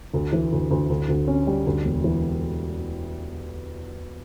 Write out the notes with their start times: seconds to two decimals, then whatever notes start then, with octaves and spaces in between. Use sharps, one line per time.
0.14 D2
0.33 E3
0.52 D2
0.71 D2
0.90 D2
1.09 D2
1.28 C#4
1.47 G3
1.66 D2
1.85 E1
2.04 E3